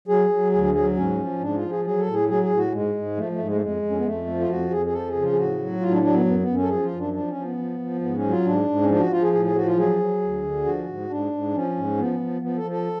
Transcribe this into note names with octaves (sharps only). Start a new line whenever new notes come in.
F#3 G#4
F#3
D2 G#4
G#4
F#3 G#4
G#2 C#4
F3
G#2 D4
F4
F3
G#4
F#3 G#4
A4
A2
G#4
F#3 G#4
G#4
A2
F#4
G#2 G#3
G#2
F3 A3
A3
G#2
G#3
A3
F2 G#3
F2
C#4
B3
F2 A3
F3
F4
F2 F#4
F2 G#4
G#4
F3 A4
G#4
C#3
F4
G#4
A2 F#4
F#3
A2 F4
D4
F#3 D4
B3
F#2 B3
B3
F#2
C#4
A4
F3 G#4
F4
F#2
D4
F3 D4
C#4
F3
B3
F3
F3
G#2 B3
C#4
F#3
F4
G#2 D4
G#2
C#4
F3 D4
F#4
F3 F4
G#4
A2 G#4
G#4
F3 F#4
F4
F#3 G#4
F#3
D2
D3
F3 F#4
G#2
G#2 D4
G#2
F3 C#4
G#2
F3 B3
F3
F3 B3
A4
F3
A4